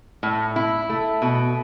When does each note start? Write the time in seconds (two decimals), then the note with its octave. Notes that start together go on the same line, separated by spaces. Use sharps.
0.23 A2
0.56 E4
0.90 A3
1.22 B2